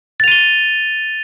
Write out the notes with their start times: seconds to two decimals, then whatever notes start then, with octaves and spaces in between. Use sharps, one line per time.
0.20 A6
0.24 F7
0.28 D#7
0.32 G7